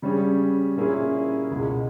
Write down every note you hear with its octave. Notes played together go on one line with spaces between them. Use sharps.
C#3 G3 C#4 G#4
A#2 A#3 C#4 E4 G#4
C#2 B2 G#3